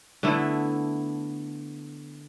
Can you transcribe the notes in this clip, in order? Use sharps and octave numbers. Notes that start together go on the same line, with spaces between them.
D3 A3 B3 E4